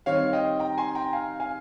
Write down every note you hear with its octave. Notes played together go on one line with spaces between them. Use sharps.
D#3 G3 C4 C#5 F5
D#5 G5
G5 A#5
G#5 C6
G5 A#5
F5 G#5
F5 G#5